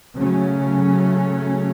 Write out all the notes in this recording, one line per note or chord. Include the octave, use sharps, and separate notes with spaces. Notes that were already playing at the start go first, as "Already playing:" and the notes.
C#3 F#3 A3 C#4